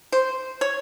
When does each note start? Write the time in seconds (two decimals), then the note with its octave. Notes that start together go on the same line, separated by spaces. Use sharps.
0.12 C5
0.61 C#5